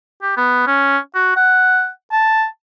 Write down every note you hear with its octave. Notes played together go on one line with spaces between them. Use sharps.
G4
B3
C#4
F#4
F#5
A5